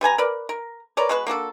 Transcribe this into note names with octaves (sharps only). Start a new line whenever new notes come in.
G3 B4 G#5 A#5
A#4 B4 D5
A#4
A#4 B4 C#5 D5
G#3 B3 F#4 B4
A#3 D4 F#4 A4